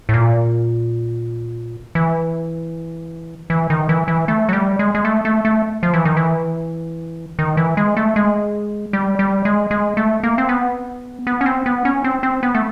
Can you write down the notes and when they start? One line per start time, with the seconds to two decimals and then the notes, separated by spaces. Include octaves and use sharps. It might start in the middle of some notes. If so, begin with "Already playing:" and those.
0.09 A2
0.14 A#2
1.95 E3
3.50 E3
3.70 D#3
3.89 E3
4.08 E3
4.28 A3
4.49 F#3
4.53 G3
4.79 G#3
4.95 G#3
5.05 A3
5.25 A3
5.45 A3
5.83 F3
5.94 E3
6.05 D#3
6.17 E3
7.39 D#3
7.57 E3
7.77 G#3
7.97 A3
8.16 G#3
8.93 G3
9.19 G3
9.45 G#3
9.71 G#3
9.97 A3
10.23 A#3
10.38 C4
10.49 B3
11.27 B3
11.41 C#4
11.46 C4
11.66 B3
11.85 C#4
12.04 C4
12.23 C4
12.43 B3
12.55 A3